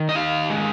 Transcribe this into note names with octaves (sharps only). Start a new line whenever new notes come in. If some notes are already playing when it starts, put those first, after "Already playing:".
Already playing: D#3
D#5
D#4 F5
G#3